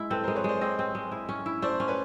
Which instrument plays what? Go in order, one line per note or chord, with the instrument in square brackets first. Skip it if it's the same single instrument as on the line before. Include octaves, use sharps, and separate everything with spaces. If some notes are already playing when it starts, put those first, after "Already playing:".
Already playing: [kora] G#3 E4
[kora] C4 [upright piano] A4 B4
[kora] G#3 [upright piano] A#4 C5
[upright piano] B4 C#5
[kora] G#3 [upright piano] C5 D5
[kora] C4 [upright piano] C#5 D#5
[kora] C4
G#3
E4
C#4
E4
[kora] A3 [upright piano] C5 D5
[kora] C#4
[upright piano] B4 C#5